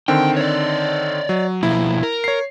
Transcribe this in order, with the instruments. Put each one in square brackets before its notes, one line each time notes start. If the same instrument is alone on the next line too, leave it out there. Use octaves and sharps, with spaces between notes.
[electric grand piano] D3 D#3 C4 [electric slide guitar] G5
[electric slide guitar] C#5 D5
[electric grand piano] F#3
[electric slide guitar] B2 F3 A#3 [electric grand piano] E4
[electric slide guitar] A#4
[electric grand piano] C#5 C7